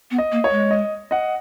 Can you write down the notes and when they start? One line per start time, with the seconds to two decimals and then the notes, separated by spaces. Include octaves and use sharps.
0.11 B3
0.18 D#5
0.32 A#3
0.44 C#5
0.51 G#3
0.71 D#5
1.11 D#5 F#5